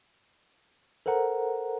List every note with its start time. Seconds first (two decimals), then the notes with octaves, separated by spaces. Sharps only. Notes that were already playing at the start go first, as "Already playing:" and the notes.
1.06 A4 A#4 C5 F#5 A#5